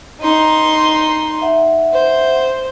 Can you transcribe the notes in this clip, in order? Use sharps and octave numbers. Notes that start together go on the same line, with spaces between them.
D#4 C6
E5 F#5
C5